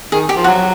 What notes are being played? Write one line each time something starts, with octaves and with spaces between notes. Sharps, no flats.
D#3 G#4
G4
F3
F#4
F#3